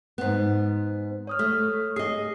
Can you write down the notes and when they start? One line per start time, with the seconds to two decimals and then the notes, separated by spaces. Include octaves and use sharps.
0.18 G#2 B3
1.27 C#5 D#6 F6
1.39 A3
1.96 G#4 D#5 D#6 C7